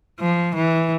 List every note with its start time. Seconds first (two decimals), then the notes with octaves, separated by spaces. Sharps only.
0.20 F3
0.55 E3